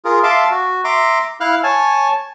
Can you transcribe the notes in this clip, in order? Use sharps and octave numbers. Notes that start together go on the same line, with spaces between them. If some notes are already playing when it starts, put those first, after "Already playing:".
F4 G#4 A#4
E5 F5 A5 C6 D6
F#4
E5 A#5 C6 D6
E4 F5 F6 F#6
C#5 G#5 A5